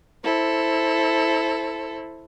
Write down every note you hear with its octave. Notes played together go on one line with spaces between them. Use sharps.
E4 A4 C5